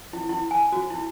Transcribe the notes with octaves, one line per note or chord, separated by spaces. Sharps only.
E4
E4
G#5
F#4
E4